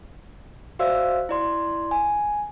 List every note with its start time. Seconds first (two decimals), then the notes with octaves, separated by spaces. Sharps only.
0.79 F#4 C5 D5 E5 F5 E6
1.29 E4 D5 C6
1.91 G#5